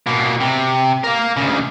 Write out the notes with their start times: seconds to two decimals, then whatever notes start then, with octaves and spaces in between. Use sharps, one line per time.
0.06 B2 A#3
0.40 C3
1.04 A#4 F5
1.37 D2 C#3